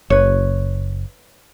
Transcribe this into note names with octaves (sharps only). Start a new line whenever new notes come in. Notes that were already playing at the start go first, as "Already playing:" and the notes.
F#1 B4 C#5